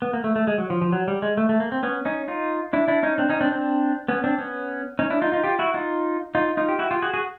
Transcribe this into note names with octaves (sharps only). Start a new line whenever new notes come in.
B3
A#3
A3
A3
G#3
F#3
F3
F3
F#3
G3
G#3
A3
A3
A#3
C4
B3 C#4
C#4 D#4
D#4 F4
D4 E4
D4 E4
C#4 D#4
C4 D4
C#4 D#4
C4 D4
C4 D4
B3 C#4
C4 D4
B3 C#4
C#4 D#4
D4 E4
D#4 F4
D#4 F4
F4 G4
E4 F#4
D#4 F4
D#4 F4
D#4 F4
G4
E4 F#4
F4 G4
F#4 G#4
F#4 G#4